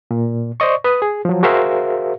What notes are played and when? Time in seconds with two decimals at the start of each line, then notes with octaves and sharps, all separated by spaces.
0.11 A#2
0.60 C5 D5 D#5 C#6
0.84 B4 D#6
1.02 G#4
1.25 F3 F#3
1.43 F#4 G#4 A#4 C5 E5 F5